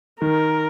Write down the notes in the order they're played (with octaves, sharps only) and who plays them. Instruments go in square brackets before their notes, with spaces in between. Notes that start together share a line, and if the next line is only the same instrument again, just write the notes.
[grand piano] D#3 [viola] A#4